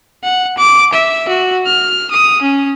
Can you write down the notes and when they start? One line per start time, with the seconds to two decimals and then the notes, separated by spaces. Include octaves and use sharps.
0.24 F#5
0.58 D6
0.93 E5
1.28 F#4
1.66 F6
2.11 D#6
2.42 C#4